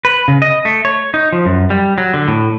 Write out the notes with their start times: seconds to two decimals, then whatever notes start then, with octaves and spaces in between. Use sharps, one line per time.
0.05 B4
0.28 C#3
0.42 D#5
0.65 A3
0.85 C#5
1.14 D#4
1.33 F3
1.46 F#2
1.70 G3
1.98 F#3
2.14 D3
2.28 A2